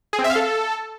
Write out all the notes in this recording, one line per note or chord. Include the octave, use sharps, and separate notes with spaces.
G#4
C4
E5
F5
A4